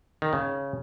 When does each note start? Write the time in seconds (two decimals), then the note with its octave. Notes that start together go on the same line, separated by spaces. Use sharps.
0.22 D#3
0.33 C#3